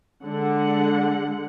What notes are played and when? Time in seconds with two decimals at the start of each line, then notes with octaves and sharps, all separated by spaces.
0.24 D3 G#3 F#5